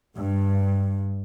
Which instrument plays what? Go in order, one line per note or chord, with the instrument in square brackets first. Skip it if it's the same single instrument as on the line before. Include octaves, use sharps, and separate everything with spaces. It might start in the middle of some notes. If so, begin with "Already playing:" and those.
[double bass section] G2